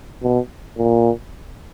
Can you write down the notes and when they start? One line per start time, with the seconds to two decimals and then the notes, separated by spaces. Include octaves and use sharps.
0.23 B2
0.77 A#2